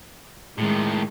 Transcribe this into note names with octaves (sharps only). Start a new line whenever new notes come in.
A2 D#3 G#3